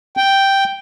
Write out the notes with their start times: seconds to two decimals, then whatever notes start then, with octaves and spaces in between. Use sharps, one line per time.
0.17 G5